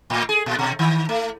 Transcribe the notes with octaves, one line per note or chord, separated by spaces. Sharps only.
A2
G#4
A#2
B2
D#3
A3